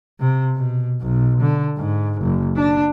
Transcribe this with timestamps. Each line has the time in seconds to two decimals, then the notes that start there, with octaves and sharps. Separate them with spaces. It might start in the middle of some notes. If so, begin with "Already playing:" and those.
0.20 C3
0.56 B2
1.01 B1
1.41 D3
1.77 G#2
2.21 F#1
2.56 D4